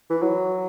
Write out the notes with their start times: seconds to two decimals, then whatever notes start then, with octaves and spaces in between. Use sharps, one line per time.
0.10 E3
0.22 F#3